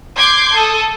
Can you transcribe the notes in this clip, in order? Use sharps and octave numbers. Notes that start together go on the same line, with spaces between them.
C6 D6 G6 G#6 C7
A4 D#6